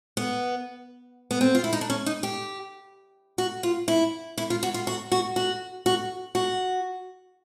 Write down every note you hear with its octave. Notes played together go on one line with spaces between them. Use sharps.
B3
B3
C4
F4
E4
D#4
D4
C#4
D#4
G4
F#4
F4
E4
E4
F4
F#4
F4
F#4
F#4
F#4
F#4
F#4